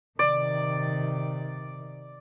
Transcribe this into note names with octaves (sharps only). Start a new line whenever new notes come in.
C3 D#3 D5